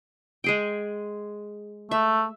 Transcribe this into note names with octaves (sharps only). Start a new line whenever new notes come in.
G#3 G#4 G5
A3 E5